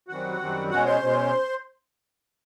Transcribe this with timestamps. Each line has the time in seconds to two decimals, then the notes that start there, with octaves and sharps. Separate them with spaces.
0.08 F#2 D#3 G3 C4 F#4 F#5
0.39 F#2 D#3 G3 C4
0.70 B2 G#3 C#4 F#4 F#5
0.85 C5 C6
1.01 B2 G#3 C#4